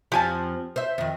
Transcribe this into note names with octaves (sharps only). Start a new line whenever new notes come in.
F2 F3 G4 G#5 A5
C5 E5
F2 D#3